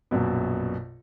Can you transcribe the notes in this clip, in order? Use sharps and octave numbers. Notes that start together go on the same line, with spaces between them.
A#1 F#2 B2